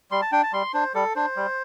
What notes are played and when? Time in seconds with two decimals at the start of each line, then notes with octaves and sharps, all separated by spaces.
0.11 G3 C6
0.22 A5
0.32 D4 G5
0.43 A5
0.53 G3 C6
0.74 D4 C5
0.94 G3 A4
1.16 D4 C5
1.37 G3